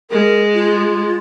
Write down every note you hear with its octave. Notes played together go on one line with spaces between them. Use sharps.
G#3 A#4
F4